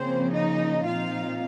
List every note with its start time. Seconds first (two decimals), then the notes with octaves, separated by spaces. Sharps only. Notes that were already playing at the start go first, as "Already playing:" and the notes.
Already playing: C#3 F3 A#3 C4 C#4 C5
0.33 D#4 D#5
0.86 A#2 F3 C4 D#4 F4 F5